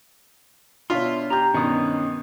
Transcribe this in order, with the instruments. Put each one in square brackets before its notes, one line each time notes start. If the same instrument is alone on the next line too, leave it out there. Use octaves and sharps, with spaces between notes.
[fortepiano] B2 F4 [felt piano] D4 C#5 [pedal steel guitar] E5 C6
[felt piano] G4 G6 [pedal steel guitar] A#5
[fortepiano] G2 B2 [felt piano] D#3 [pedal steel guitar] C#4 D#6